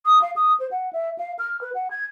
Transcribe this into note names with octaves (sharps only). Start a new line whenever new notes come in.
D#6
F5
D#6
C5
F#5
E5
F5
F6
B4
F#5
G#6